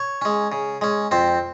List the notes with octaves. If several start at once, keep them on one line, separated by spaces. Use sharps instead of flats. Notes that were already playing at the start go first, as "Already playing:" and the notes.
Already playing: C#5
G#3 C#4
C#3
G#3 C#4
F2 C4 C5